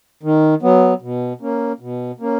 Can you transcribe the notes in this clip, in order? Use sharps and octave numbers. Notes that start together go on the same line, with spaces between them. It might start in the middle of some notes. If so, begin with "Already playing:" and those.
D#3
F#3 B3
B2
A#3 C#4
B2
A#3 C#4